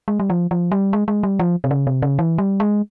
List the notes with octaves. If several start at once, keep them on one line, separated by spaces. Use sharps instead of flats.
G#3
G3
F3
F3
G3
G#3
G#3
G3
F3
C3
C#3
C3
C#3
E3
G3
G#3